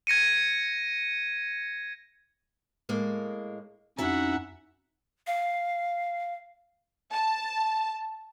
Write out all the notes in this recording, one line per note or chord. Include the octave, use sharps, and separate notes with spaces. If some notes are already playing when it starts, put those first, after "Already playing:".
G#6 A#6 C#7 D#7
A2 G#3 A#3
F2 C#4 D#4 E4 F#4 C#5 E5 F#5
F5
A5